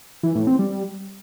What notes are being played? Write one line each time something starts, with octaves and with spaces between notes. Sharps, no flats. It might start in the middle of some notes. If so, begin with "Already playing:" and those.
E3
A2
C4
G3